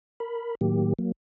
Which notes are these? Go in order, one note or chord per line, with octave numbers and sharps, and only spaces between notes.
A#4 B5
A2 D#3 F#3 A#3 G4
F#3 A#3